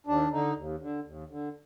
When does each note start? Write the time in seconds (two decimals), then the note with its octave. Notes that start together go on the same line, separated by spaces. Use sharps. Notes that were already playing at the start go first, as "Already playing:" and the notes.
0.07 D#2 D4
0.32 D3 D#4
0.56 D#2
0.81 D3
1.05 D#2
1.29 D3